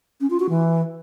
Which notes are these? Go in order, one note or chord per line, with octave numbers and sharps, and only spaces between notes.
C#4
F4
F#4
E3